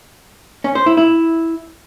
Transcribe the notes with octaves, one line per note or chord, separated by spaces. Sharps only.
C#4
C5
E4
E4